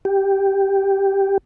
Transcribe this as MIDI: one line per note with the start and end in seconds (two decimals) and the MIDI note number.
0.05 1.38 67